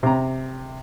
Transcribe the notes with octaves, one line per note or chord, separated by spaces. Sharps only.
C3 A#5